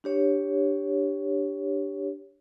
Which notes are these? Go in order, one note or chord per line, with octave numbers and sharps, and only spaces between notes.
D4 G4 C#5